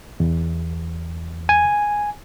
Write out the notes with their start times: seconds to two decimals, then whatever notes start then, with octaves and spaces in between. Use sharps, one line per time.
0.20 E2
1.49 G#5